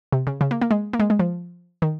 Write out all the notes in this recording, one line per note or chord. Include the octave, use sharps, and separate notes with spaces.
C3
C#3
C#3
A#3
A#3
G#3
A#3
G#3
G#3
F3
D#3